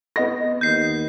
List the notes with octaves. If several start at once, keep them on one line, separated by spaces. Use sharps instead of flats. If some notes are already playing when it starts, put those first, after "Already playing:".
B3 D#5 A#6
D#2 G6 C7